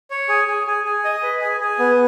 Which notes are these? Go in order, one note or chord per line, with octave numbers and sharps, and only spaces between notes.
C#5
G#4
G#4
G#4
G#4
D#5
B4
G#4
G#4
B3